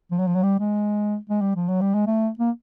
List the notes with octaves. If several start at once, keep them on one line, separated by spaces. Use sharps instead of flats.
F3
F#3
F3
F#3
G3
G#3
G#3
G3
F3
F#3
G3
G#3
A3
A#3